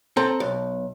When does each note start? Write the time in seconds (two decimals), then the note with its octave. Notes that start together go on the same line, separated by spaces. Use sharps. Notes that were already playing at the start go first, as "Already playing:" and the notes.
0.17 C4 A4 A#5
0.40 B1